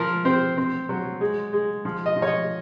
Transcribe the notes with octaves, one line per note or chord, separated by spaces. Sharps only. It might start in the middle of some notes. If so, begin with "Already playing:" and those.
Already playing: F3 A#4
C4 C5
C4
F#3
G#3
G#3
F3
D#5
F3
C#5
D#5